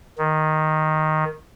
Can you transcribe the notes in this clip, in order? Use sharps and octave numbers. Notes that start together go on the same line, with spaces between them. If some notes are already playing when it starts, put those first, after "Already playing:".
D#3